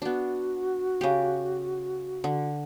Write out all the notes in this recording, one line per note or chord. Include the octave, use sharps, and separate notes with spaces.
B3 D4 F#4
C#3 G4
D3